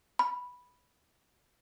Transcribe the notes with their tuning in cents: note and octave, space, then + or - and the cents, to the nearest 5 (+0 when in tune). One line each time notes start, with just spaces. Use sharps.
B5 -5